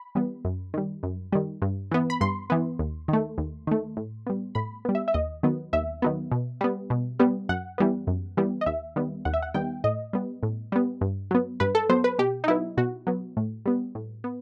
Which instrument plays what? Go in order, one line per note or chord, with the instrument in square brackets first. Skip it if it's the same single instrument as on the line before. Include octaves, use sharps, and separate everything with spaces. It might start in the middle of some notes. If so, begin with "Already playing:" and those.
Already playing: [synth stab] B5
E3 G3 B3
F#2
D#3 G3
F#2
D#3 G3
G2
E3 B3
B5
G2 C6
E3 B3
D#2
D#3 A3
D#2
D#3 A3
A2
G3 B3
A2 B5
G3 B3
E5
E5
D#2 D#5
D#3 F#3 B3
D#2 E5
D#3 F#3 B3
B2
G3 B3
B2
G3 B3
F#2 F#5
E3 G3 B3
F#2
E3 G3 B3
D#5
D#2 E5
D#3 G3 B3
D#2 F#5
E5
F#5
D#3 G3 B3 G5
A2 D#5
G3 B3
A2
G3 B3
G2
F#3 B3
G2 B4
A4
F#3 B3 C5
B4
B2 G4
D#4
F#3 B3 E4
B2 F#4
F#3 B3
A2
G3 B3
A2
B3